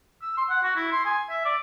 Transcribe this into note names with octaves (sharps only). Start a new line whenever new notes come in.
E6
C6
F#5
F#4
E4
C6
G#5
E5
D5